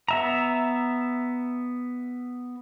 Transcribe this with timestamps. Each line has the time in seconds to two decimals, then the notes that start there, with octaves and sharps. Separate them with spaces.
0.09 B3 E5 A#5